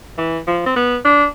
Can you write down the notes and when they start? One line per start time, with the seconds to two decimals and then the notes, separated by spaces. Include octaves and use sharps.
0.18 E3
0.47 F3
0.66 C4
0.76 B3
1.05 D4